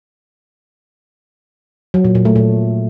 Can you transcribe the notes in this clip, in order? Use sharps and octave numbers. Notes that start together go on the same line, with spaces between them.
F#3
A#2
A#2
A3
A#2